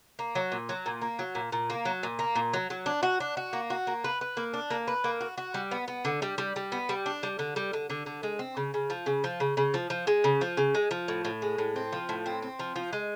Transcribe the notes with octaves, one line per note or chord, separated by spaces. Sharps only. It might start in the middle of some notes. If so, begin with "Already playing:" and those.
A#3
F#3
A#2
F#3
A#2
A#3
F#3
A#2
A#2
A#3
F#3
A#2
A#3
A#2
F#3
F#3
D4
F#4
D4
F#4
A#3
F#4
A#3
B4
B4
A#3
D4
A#3
B4
A#3
F#4
F#4
G3
B3
B3
D3
G3
G3
G3
B3
G3
D4
G3
D3
G3
D3
D3
D3
G#3
C4
C#3
C#3
F3
C#3
F3
C#3
C#3
F3
F3
G#3
C#3
F3
C#3
G#3
F3
A2
A2
G#3
A2
C4
F3
A2
C4
C4
F3
F3
G#3